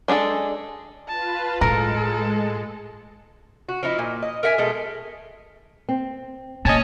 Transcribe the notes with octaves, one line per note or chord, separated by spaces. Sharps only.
G#3 D4 G#4 A4
F4 B4 A5
A2 G#3 A4 A#4
F#4
F3 D#4 E4
A#2
D#5
A#4 E5 F#5 G#5
B2 G#3 A3
C4
A#2 C#4 D#5 G#5 A5